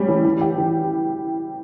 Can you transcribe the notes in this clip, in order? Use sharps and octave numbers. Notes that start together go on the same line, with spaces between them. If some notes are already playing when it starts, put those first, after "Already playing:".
Already playing: G3 C#4
E3
E3
G4
E3